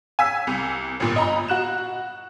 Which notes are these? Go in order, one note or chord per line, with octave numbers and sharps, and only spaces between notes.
G#5 E6 B6
C2
G1 A#2
D#5 A#5 B5
F#4 F#6 E7